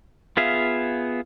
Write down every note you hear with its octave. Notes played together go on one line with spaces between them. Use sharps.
B3 F4 G#4 E5 F5